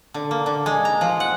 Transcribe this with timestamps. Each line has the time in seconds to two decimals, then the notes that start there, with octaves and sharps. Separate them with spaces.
0.14 D3
0.31 A#3
0.46 D3
0.66 G#3
0.85 A#5
1.01 F3
1.20 F#5